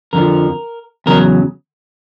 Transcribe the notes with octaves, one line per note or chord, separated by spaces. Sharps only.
F2 D3 F3 A#4
E2 C#3 F#3 A#4